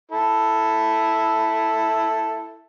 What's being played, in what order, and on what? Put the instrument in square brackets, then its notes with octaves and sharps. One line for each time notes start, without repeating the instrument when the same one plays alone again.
[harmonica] E4 A4